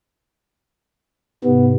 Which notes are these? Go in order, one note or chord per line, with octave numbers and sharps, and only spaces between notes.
G#2 C3 B3